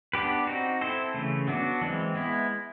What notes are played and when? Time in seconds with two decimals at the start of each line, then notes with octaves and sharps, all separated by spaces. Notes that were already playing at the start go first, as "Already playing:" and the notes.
0.14 B3 D4 G4 B4
0.47 C4 D#4 F#4
0.81 C4 E4 A4 C5
1.14 C#3 E3 A3
1.48 F#3 B3 D4 F#4
1.81 E3 G#3 C4
2.15 G#3 B3 E4